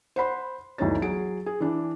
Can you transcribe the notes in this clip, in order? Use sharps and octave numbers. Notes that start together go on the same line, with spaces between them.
C5 F#5 B5 C6
G1 D2 E3 D#4 C#5 A6
F#3 G#4 D7
G#4
E3 D4